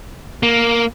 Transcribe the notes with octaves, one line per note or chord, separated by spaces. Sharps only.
A#3